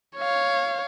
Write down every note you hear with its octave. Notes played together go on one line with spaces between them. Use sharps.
C#5 F5